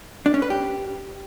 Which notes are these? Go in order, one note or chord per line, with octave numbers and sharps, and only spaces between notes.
D4
C#4
B4
G4